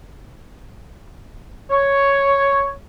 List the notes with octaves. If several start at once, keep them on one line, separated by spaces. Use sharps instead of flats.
C#5